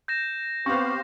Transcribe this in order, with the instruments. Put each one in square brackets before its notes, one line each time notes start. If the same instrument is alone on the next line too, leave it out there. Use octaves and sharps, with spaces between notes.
[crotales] G6 A#6 E7
[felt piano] B3 C4 [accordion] G4 C5 F5 [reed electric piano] C#6